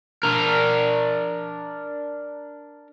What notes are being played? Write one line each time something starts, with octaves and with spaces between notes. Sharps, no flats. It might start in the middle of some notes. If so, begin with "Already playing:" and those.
D4 A#4